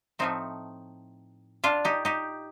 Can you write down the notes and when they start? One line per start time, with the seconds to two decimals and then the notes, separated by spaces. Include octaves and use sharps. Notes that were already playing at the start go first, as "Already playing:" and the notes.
0.19 A2 F3 A3 C4 D#4
1.64 D4 F4
1.85 D#4 G4
2.05 D#4 G4